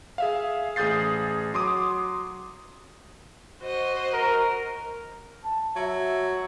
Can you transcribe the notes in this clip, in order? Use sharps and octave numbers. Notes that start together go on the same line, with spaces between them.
G#4 E5 F5
A1 G#4 D#6 G6 A6 C7
F#3 C6 D6 D#6
F#4 C5 D#5
A#4
A5
F#3 E5